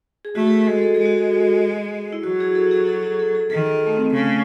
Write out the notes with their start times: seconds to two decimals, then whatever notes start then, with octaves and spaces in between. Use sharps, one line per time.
0.25 G#4
0.35 A3 F#4
0.47 A4
0.50 G#4
0.66 G#3 A4
0.82 A4
0.94 G#3 G#4
1.06 F#4
1.18 G#4
2.13 E4
2.24 F#3 F#4
2.40 G#4
2.55 A4
2.71 G#4
2.87 A4
3.03 G#4
3.19 A4
3.35 G#4
3.50 D#3 A4
3.87 A3
3.97 C4
4.13 C#3 A3